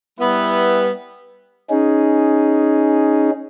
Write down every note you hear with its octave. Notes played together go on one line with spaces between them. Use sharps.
G3 B3 E4
C#4 D#4 G#4